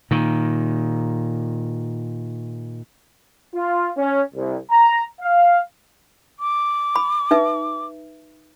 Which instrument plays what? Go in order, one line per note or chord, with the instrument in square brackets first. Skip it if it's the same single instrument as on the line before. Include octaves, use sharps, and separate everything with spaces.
[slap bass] A#2 D#3
[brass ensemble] F4
C#4
C2
A#5
F5
[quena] D6
[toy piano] B5
D#4 B4 E5